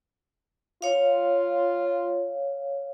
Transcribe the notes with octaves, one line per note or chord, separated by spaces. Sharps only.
F4 C#5 F5